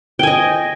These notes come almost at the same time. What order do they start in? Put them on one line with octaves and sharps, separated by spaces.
G5 G#5 D#5